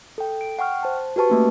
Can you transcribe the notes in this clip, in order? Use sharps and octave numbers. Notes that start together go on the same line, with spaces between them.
A4 G5
D7
F#5 G5 C#6 F6
C5 A5
F#4 G4 B4 A5 C#6
A3 A#3 C#4